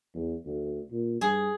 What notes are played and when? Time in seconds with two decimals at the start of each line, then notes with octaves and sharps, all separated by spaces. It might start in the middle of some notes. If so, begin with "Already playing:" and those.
0.14 E2
0.45 D2
0.92 A#2
1.21 G2 G#4